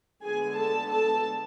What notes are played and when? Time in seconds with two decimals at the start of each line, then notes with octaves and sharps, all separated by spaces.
0.23 D3 G#3 B3 G#4 G#5
0.57 A4 A5
0.91 A4 A5